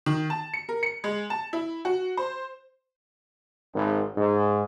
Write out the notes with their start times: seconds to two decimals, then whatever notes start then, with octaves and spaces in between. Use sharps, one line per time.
0.06 D#3
0.30 A5
0.54 C#7
0.69 A#4
0.83 C#7
1.04 G#3
1.30 A5
1.53 E4
1.85 F#4
2.17 C5
3.75 G#1
4.17 G#2